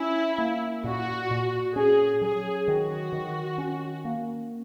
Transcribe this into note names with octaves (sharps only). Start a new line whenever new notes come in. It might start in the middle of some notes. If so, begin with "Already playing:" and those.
Already playing: C#4 E4
A#3
A#2 F#4
A#2
C#4 G#4
F#3 G#4
D#3 F#4
D#3
C#4
A#3